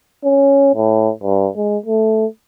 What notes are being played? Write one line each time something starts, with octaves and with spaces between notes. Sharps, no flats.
C#4
A2
G2
G#3
A3